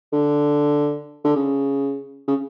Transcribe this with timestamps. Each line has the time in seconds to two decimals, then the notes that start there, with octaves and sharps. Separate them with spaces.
0.13 D3
1.24 D3
1.36 C#3
2.28 C#3